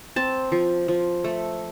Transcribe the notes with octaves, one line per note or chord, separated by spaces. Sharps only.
C4 A5
F3
F3
A3